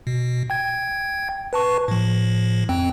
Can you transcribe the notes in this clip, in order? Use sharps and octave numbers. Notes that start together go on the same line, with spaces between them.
B2
G5 G#6
B4 A5 C#6
A2 F3
F2 C4 G5